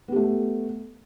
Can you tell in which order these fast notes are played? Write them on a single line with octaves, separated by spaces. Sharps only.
B3 G4 A3